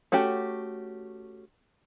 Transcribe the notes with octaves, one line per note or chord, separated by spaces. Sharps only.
A3 C#4 F#4 G4